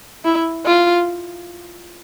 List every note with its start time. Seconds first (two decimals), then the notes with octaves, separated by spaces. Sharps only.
0.25 E4
0.66 F4